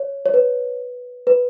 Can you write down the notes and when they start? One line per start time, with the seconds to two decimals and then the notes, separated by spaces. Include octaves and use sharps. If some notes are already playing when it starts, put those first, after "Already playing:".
Already playing: C#5
0.26 C#5
0.34 B4
1.27 B4